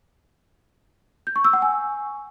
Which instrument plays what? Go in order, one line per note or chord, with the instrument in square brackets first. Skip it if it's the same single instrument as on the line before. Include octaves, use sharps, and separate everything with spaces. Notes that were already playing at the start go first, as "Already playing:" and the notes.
[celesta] G6
C#6
E6
F#5
G#5